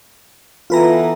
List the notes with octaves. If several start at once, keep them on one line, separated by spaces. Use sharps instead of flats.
E3 B3 F4 A4 B4 A#5